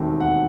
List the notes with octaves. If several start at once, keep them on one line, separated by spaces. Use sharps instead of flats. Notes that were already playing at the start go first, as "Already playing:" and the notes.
Already playing: E1 D#2 D#3 A3 C4
F#5